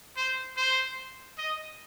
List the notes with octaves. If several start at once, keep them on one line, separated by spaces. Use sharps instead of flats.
C5
C5
D#5